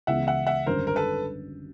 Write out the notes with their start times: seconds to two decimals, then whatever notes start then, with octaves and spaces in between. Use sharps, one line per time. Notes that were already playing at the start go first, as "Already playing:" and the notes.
0.07 C#2 C#3 E3 G#3 B3 E5 F#5
0.27 E5 F#5
0.47 E5 F#5
0.66 G#1 F#2 D3 G3 A#4 C5
0.87 A#4
0.96 A4 B4